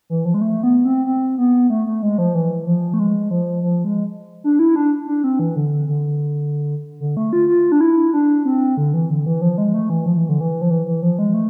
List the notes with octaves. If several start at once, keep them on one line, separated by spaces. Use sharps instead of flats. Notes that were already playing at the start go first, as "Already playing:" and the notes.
E3
F3
G#3
A3
B3
C4
C4
B3
A3
A3
G#3
F3
E3
F3
A3
G#3
F3
F3
G#3
D4
E4
D4
D4
C4
E3
D3
D3
D3
A3
F4
F4
D4
E4
D4
C4
D3
E3
D3
E3
F3
G#3
A3
E3
F3
E3
D3
E3
F3
E3
E3
F3
G#3
A3